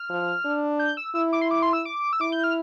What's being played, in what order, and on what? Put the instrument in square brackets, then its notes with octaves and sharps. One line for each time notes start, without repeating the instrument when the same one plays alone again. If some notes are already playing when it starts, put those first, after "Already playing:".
Already playing: [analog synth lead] F6
[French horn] F3
D4
[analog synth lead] G6
E6
[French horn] E4 [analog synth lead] E6
[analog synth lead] D6
C6
D6
C6
E6
D6
E6
[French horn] E4 [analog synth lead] D6
[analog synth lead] G6
F6